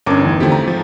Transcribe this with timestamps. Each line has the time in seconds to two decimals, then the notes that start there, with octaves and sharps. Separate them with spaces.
0.06 G1 C#4 D4 A#4 D6
0.20 E2 A2 D#3
0.40 D3 F3 A3 C4 E4 G4
0.52 A#5
0.66 G#2 F3